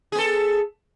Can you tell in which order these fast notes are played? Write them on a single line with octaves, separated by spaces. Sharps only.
G#4 B3 A4